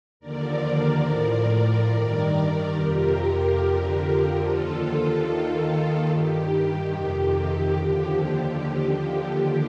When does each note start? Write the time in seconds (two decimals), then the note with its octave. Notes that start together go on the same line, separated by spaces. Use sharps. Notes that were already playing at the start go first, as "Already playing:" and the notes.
0.20 D#2 D3 F3 A#4 D5
1.03 A2 F3 A#4 D5
1.87 G2 D#3
2.70 F2 C3 F3 G4 A#4
3.55 F2 D3 F3
4.38 D#2 D3 F3 F4 A4
5.22 D#2 D#3
6.05 G2 D#3 G4
6.89 F2 C3 D#3
7.72 D#2 D3 F3 G4
8.56 D#2 D3 F3